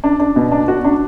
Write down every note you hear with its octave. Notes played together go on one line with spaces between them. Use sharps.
D4
D4
B2
D4
F#4
D4